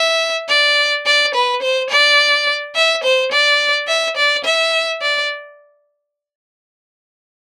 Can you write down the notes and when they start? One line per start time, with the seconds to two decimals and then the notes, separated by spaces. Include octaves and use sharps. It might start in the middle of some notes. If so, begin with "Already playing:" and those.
Already playing: E5
0.49 D5
1.06 D5
1.34 B4
1.62 C5
1.90 D5
2.75 E5
3.03 C5
3.32 D5
3.88 E5
4.16 D5
4.45 E5
5.02 D5